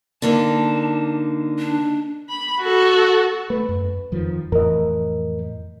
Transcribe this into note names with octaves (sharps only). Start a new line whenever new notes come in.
D3 A#3 D#4 A5
D4
B5
F#4 A4
A3 B4
F#2
F2 D#3 F3
F2 A2 E3 A#4 D#5